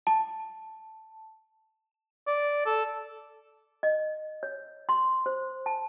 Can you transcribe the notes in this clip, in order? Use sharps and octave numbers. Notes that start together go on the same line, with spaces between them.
A5
D5
A4
D#5
C#5
C6
C5
A5